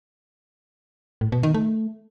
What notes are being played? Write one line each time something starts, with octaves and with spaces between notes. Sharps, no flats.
A2
B2
D#3
A3